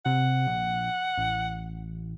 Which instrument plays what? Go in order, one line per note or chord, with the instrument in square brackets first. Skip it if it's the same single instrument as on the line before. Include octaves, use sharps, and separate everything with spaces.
[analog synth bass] C3 [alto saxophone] F#5
[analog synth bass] A#1
A1